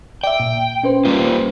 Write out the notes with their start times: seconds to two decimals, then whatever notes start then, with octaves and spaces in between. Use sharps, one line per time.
0.24 D5 E5 G5
0.40 A#2
0.84 C#4 B4 C5
1.05 G3 A#3 F4